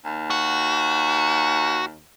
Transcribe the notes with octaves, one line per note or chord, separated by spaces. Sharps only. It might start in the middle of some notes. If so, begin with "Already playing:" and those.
D#2
F#4